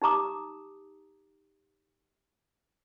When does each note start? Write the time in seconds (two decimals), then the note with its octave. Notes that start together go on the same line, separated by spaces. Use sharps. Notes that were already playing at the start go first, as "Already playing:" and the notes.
0.02 D#4 G4 A#5 D6 D#6